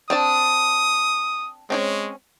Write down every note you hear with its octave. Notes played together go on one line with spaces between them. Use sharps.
C4 D4 A5 D#6
G#3 C4 C#4 C#5